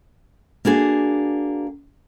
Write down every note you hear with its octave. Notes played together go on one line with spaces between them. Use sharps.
A#3 D4 F#4 G#4